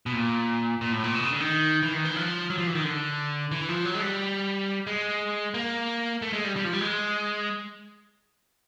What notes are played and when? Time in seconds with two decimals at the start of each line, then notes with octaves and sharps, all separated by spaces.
0.06 B2
0.13 A#2
0.81 A#2
0.92 A2
1.03 A#2
1.15 B2
1.23 C#3
1.32 D3
1.40 D#3
1.83 E3
1.93 D#3
2.05 E3
2.16 F3
2.50 F#3
2.58 F3
2.67 E3
2.75 D#3
2.84 D3
3.51 E3
3.68 F3
3.85 F#3
3.94 G#3
4.02 G3
4.87 G#3
5.54 A#3
6.22 A3
6.33 G#3
6.44 G3
6.56 G3
6.64 F3
6.73 G3
6.81 G#3